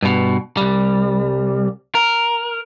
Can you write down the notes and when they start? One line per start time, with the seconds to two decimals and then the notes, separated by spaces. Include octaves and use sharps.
0.02 G2 B2
0.57 C2 G3
1.95 A#4